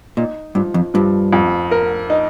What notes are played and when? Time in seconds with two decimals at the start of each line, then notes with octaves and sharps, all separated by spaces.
0.17 A#2 D#4
0.55 G2 F3
0.74 F2
0.94 G2 F3
1.33 F2
1.71 A#4
2.10 D#4